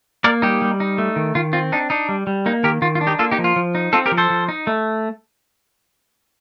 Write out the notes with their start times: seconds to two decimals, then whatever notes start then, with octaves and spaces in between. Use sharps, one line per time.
0.24 A#3 A#4 D5
0.42 G3 D#4 G4
0.62 G3
0.80 D#4
0.98 A3
1.16 D#3
1.35 D#3 F4
1.53 C4 F4
1.72 D4 D#4
1.90 D4 D#4
2.09 G3
2.27 G3
2.46 A#3 D#4
2.64 D#3 G4 A#4
2.82 D#3 F4
2.95 F4
3.01 D4
3.07 D#4 G4
3.19 A#3 F4 A4
3.31 D#4 G4
3.38 F3
3.44 F4
3.56 F3
3.75 D#4
3.93 C4 F4 A4
4.06 G4 A#4
4.12 F3
4.18 A4 C5
4.30 F3
4.49 D#4
4.67 A3